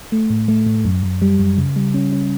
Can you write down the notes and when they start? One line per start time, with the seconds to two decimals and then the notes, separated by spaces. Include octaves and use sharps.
0.12 A3
0.30 A2
0.48 A3
0.66 A2
0.85 F#2
1.03 F#2
1.22 G3
1.39 F#2
1.58 C#3
1.76 G3
1.94 C#4
2.13 C#4